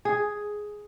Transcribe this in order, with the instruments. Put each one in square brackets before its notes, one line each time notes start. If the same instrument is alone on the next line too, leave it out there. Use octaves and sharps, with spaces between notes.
[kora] G#4